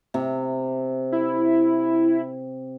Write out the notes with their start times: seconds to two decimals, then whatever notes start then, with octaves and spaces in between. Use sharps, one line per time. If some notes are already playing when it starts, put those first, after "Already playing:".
0.14 C3
1.12 E4